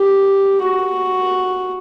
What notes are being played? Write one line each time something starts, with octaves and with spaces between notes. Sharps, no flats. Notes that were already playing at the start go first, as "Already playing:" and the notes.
Already playing: G4
F#4